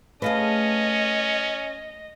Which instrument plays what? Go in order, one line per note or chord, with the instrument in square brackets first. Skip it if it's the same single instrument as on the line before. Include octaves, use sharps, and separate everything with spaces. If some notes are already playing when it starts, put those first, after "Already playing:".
[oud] A3 G#4 [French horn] C#4 [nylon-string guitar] B4 F5 A5 [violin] D#5